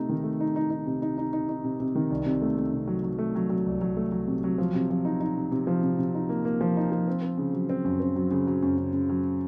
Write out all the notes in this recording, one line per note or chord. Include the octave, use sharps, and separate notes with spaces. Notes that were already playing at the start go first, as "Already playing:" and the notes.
Already playing: C3 A3 D#4
D#3
A3
D#4
D#4
D#4
C3
D#4
D#4
D#4
D#4
C3
C3
D#3
C2
C3
A3
A3
C3
F#3
F#3
A3
F#3
F#3
C2
F#3
A3
F#3
C3
F#3
F3
C3
F3
D#4
D#4
C3
C3
F3
C3
C3
D#4
A#3
A#3
F3
D#4
F3
C4
C4
C#3
F#3
C4
F#2
C4
F#3
C#3
F#3
F#2
C#3
C#3
F#3